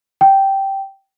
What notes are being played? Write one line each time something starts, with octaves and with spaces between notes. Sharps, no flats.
G5